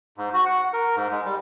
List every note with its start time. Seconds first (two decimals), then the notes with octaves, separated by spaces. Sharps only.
0.18 G#2
0.34 F#4
0.46 F#5
0.73 A#4
0.96 G#2
1.12 G#3
1.25 G3